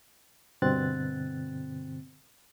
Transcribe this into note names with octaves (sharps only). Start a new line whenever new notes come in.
G2 B2 D3 C4 F#6 A6